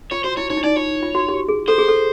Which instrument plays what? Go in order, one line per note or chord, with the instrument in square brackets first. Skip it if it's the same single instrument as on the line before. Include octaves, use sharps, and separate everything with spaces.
[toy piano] F4 [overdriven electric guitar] C#5
[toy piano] F#4 [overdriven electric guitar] C5
[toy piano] E4 [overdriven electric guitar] C#5
[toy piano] D#4 [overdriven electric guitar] C#5
[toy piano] E4
[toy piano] D#4 [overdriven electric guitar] D5
[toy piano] F4 [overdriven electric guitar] C#5
[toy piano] F4
F#4
G4
G#4
[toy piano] A4 [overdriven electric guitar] C5
[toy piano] G#4
A4